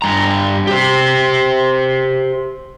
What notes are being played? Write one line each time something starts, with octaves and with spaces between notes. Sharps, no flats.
G2 A#5
G4 C5